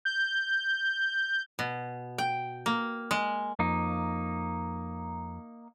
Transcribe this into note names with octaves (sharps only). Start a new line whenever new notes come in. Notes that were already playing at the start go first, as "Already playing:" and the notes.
G6
B2
G5
A#3
G#3
F2 A#3 D#4